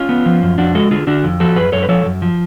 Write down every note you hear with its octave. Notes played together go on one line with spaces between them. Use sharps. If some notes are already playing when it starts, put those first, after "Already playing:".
Already playing: C#4 F4
B3
F3
F#2
F2 D4 F#4
G#3 F#4 A4
D3 F4 G#4
D3 D4 F#4
F2
F3 F#4 A4
F#2 G#4 B4
F#2 A4 C#5
B4
F3 A4 C#5
F#2
F3